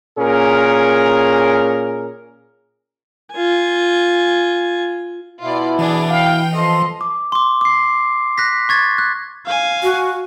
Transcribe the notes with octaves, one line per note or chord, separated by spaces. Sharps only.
A#2 C#4 G#4 A#4
F4 G#5
B2 E4 F4 D5
E3 D4 G#4
F5 G5
F3 A4 D#5 C6
D6
C6 D6
D6 C7
F#6 A#6 B6
C#6 G#6 A6
F#6
F5 G#5
F#4